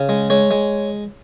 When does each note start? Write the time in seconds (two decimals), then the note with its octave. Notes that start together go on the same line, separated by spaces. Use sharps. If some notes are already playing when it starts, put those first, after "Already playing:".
Already playing: C#3
0.09 G#3
0.30 G#3 C#5
0.51 G#3